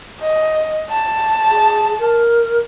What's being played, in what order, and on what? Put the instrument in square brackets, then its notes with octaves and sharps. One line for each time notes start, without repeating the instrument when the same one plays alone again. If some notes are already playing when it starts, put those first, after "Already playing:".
[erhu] D#5
A5
[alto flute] G#4
A#4